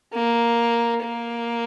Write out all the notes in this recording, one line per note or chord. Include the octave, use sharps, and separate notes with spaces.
A#3
A#3